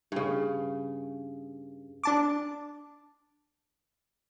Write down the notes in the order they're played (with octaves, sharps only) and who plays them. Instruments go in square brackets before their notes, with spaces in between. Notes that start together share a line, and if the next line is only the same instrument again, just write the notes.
[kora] G2 C#3
[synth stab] D4 A5 D6